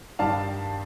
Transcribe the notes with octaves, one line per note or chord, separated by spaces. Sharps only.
G2 D#3 G3 D4 F5 A5